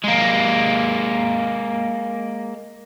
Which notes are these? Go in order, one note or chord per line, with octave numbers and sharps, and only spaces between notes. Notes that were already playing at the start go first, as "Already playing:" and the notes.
G#3 A#3